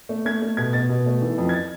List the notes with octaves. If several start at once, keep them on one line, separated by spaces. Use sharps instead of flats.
A3
A3 G#6
A3
B2 G#6
B2 A6
B2
A3
E3
F2
G#6
A6